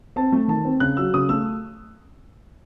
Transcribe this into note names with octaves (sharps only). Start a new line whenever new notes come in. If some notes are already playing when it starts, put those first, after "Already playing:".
C4 A5
A3
D#3 A5
C4
C#3 F#6
F#3 E6
C#3 D#6
A3 E6